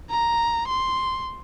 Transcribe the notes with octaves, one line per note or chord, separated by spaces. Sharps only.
A#5
C6